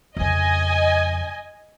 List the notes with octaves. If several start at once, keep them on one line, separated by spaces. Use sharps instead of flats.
F2 C#3 D#5 G#5